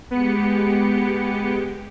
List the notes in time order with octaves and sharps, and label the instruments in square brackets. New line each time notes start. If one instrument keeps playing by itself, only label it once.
[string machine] G#3 G4 [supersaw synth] B3 C#7